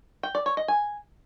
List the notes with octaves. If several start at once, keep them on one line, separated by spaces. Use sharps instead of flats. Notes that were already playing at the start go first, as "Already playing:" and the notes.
G5
D5
C#5
D#5
G#5